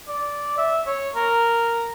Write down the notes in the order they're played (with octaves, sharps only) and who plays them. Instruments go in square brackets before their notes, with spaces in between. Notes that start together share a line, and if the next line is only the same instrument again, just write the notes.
[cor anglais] D5
E5
C#5
A#4